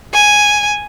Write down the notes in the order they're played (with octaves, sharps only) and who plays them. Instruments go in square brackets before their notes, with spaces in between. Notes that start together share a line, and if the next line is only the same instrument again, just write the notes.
[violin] G#5